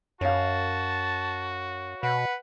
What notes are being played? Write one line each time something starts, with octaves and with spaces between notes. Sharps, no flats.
F#2 F#4 C#5 F5 A5
B2 B4 F#5